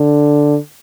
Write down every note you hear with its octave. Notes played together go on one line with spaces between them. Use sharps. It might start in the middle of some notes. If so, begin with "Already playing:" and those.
Already playing: D3